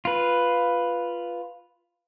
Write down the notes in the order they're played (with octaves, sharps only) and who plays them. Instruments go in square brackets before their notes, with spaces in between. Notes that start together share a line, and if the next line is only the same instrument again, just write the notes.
[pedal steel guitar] F4 B4